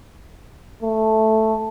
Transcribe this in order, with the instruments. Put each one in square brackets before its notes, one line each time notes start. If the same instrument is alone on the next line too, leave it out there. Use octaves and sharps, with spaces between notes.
[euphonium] A3